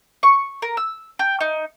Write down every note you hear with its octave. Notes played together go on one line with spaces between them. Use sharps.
C#6
A#4
E6
G5
D#4